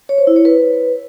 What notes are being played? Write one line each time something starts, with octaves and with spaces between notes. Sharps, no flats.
C#5
C5
E4
C#5
B4